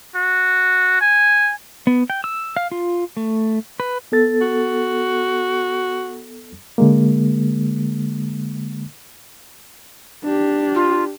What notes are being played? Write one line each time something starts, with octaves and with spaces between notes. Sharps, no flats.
F#4
G#5
B3
G5
E6
F5
F4
A3
B4
B3 A4 A6
F#4
D3 G#3 A#3
D4 G4
F4